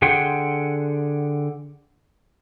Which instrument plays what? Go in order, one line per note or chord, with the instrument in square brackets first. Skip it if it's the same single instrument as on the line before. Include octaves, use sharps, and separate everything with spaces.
[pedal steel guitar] D3 G#4 F#5 G5 C6